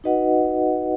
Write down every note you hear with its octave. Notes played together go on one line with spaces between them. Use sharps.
D#4 F#4 B4 D#5 F#5